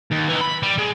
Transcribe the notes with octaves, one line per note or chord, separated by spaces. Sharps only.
D#2
E3 D#4
B5
G3
G#3